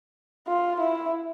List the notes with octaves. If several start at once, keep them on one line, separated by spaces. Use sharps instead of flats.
F4
E4